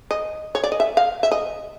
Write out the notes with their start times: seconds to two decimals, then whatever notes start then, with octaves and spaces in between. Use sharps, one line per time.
0.11 D#5
0.55 C#5
0.64 D5
0.72 D#5
0.80 E5
0.97 F5
1.23 E5
1.32 D#5